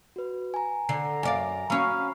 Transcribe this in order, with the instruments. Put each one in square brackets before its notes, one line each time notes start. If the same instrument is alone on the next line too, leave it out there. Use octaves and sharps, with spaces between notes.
[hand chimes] F#4 B4
G#5 A#5
[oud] D3 [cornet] A#5 [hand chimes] C7
[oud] F#2 D5 F5 [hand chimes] G#5
[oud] F#3 C#4 [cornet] F5 [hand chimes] A#5 B5